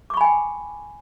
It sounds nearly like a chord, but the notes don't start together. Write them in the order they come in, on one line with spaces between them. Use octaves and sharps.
D6 C#6 B5 G#5 G5